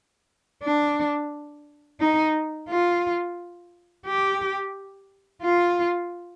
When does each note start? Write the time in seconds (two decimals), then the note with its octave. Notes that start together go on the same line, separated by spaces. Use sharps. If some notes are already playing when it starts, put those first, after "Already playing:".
0.63 D4
1.99 D#4
2.69 F4
4.06 G4
5.42 F4